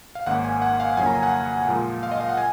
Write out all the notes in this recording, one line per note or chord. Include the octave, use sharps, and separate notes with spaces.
F5
G#1 G#2 D#3 A#3 C#4 F#5
G#5
F#5
F5
F2 C#3 F#3 A#3 C#4 G#5
A#5
G#5
F#5
A#2 F3 G#3
F5
D#5
F5
F#5
G#5